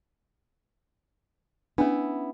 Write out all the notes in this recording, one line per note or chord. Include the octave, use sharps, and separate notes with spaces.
B3 C#4 D4 E4